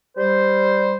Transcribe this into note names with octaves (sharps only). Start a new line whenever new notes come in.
G3 C5